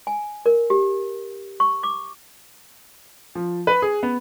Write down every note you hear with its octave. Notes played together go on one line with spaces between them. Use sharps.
G#5
A#4
G4
C#6
D6
F3
B4
G#4
B3